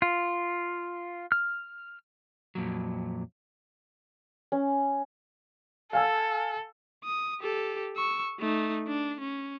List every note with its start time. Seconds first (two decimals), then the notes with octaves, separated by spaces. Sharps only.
0.02 F4
1.32 F6
2.55 F2 A#2 F#3
4.52 C#4
5.93 A4 F5 G#5 E6
7.04 D#6
7.41 G4 A4
7.96 C#6 E6
8.39 A3 D#4
8.88 D4
9.20 C#4